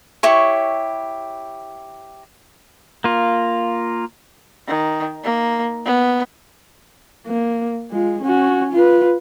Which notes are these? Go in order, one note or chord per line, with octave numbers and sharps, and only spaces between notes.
E4 G4 C#5 C#6
A#3 F4
D#3
A#3
B3
A#3
G#3 F4
C#4 F#4
F4 B4